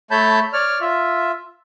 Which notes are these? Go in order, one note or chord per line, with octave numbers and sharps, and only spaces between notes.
A3 C#5 A5 B5 G6
C#5 D5 F6
F4 E5